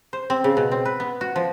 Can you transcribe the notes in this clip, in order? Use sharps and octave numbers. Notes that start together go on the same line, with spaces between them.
C5
C4
C#3
B2
C4
B4
B3
F#4
F3